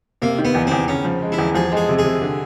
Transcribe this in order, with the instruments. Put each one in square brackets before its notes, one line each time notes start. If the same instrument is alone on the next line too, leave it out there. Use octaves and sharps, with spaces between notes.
[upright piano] C3 [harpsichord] A#3
[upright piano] D#3
[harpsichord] B3
[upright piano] E2
[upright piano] E2 [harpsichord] C4
[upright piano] C#3 [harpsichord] C#4
[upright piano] F3
G#3
[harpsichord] E4
[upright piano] E2
[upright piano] F3 [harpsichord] G#4
[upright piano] G#3 [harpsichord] G#4
[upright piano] C3
[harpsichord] G#4
[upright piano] C3
D3